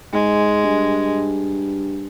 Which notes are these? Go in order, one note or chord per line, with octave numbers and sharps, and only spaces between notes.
G#2 G#3
G2